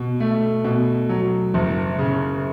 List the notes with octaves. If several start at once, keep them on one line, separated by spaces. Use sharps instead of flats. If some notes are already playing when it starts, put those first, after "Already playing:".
Already playing: B2
A3
B2
F#3
F#1
C#3